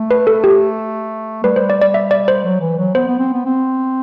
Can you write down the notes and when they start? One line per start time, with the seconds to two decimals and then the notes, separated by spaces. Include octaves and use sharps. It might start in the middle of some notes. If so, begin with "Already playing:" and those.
Already playing: A3
0.11 B4
0.27 A4
0.44 G4
1.44 G3 B4
1.56 C5
1.70 D5
1.81 D5
1.94 E5
2.11 D5
2.28 C5
2.45 F#3
2.60 E3
2.78 F#3
2.95 B3 C5
3.07 B3
3.19 C4
3.33 B3
3.45 C4